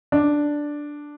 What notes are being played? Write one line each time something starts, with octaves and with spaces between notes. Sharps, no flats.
D4